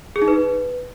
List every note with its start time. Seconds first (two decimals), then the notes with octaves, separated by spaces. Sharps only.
0.16 G#4
0.22 D#4
0.28 B4